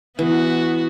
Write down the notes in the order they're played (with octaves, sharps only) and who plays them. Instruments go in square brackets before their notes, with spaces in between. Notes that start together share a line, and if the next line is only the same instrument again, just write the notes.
[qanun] E3 [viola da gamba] B3 F#4